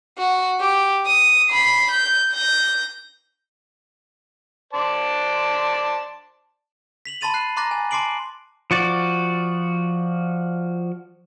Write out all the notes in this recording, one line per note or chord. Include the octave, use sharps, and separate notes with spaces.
F#4
G4
D#6
B5 C7
G6
G6 A#6
C5 D5 A5
B6 F7 F#7
A5 B5 C6 A6 D#7 F7
F#6 C7
A#5 C6 D6 F#6 A6 A#6
G#5
A5 C6 D6 C7 D7 F#7
F3 F#4 D5